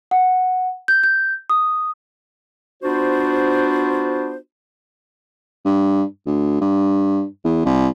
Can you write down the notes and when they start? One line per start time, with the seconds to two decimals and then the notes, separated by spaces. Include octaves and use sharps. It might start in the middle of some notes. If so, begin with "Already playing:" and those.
0.11 F#5
0.88 G6
1.04 G6
1.50 D#6
2.83 B3 D4 F4 F#4 C5
5.65 G2
6.26 D2
6.61 G2
7.44 E2
7.65 C2